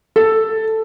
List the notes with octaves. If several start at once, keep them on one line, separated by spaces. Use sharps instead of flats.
A4